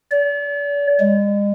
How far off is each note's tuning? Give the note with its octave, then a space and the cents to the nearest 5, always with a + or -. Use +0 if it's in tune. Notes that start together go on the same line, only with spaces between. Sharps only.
D5 -40
G#3 -40